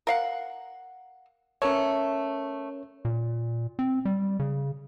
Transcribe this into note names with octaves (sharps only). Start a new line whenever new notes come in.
A#4 F5 F#5
A3 B3 C#4 A#4 C#5
A#2
C4
G3
C#3